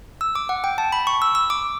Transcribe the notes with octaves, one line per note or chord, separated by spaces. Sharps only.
E6
D6
F#5
G5
A5
B5
C#6
E6
E6
D6